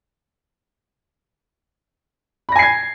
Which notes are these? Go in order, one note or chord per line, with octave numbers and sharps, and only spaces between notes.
G#5 B5 G#6 A#6 C7